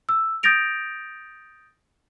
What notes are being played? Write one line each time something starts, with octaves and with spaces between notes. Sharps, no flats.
E6
D#6 G6 A6 A#6 D7 F7